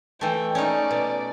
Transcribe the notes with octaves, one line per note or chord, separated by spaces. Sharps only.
E3 A3 G5
C#4 D#4 D5
B2